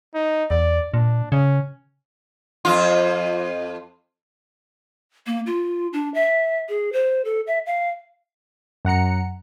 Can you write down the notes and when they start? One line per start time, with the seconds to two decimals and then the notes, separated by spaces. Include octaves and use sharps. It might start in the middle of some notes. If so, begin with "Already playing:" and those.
0.14 D#4
0.51 E2 D5
0.94 A#2 D4
1.32 C#3 C#4
2.65 F2 F4
5.27 A#3
5.46 F4
5.93 D4
6.14 E5
6.69 G#4
6.93 C5
7.25 A4
7.47 E5
7.66 F5
8.85 F#2 F#5 A#5 C#7